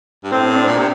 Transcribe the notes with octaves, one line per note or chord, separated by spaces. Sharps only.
G2
A2 C4
C4
D4
A#2
C3